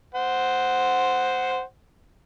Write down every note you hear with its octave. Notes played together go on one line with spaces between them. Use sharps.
C5 F#5